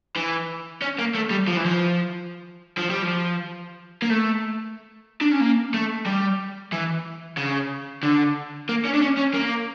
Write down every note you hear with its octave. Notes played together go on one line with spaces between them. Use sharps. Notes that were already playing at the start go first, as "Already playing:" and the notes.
E3
C#4
A#3
A3
G3
F3
E3
F3
F3
G3
F3
A#3
A3
D4
C#4
A#3
A3
G3
E3
C#3
D3
A#3
C#4
D4
C#4
C#4
A#3